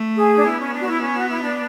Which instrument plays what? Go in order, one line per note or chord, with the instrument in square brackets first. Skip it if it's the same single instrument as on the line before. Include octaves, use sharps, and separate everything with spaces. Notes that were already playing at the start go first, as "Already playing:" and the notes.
Already playing: [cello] A3
[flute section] G#4
D4
[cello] B3 [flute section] E4
[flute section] C#4
D4
F#4
E4
C#4
F#4
E4
D4